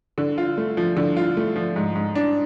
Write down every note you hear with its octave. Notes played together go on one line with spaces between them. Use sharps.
D3
F4
A3
F3
D3
F4
A3
F3
G#2
G#2
D4